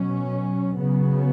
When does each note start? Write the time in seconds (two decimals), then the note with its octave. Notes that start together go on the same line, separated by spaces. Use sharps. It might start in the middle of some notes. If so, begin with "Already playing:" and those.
Already playing: B2 F#3 C#4
0.78 C#3 F#3 B3